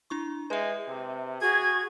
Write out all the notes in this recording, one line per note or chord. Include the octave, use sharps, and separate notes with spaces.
D4 E4 C#6
G#3 B4 E5
C3
F#4 G#4 G#6